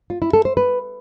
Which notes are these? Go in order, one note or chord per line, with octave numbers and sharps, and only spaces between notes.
F4
E4
A4
C5
B4